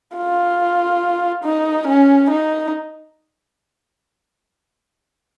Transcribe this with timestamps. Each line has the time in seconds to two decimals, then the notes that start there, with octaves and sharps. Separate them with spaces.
0.17 F4
1.45 D#4
1.88 C#4
2.31 D#4